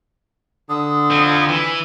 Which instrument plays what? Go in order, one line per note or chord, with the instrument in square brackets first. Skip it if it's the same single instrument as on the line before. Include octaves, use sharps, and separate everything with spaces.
[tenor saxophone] D3 [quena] D#6
[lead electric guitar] F3 C4
E3